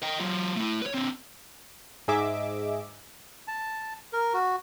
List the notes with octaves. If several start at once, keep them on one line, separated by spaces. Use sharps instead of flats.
D#5 G5
F#3 F4
A3 E4
B4 C#5
D3 C4
G#2 G#4 D#5 E5 D6
A5
A#4
F#4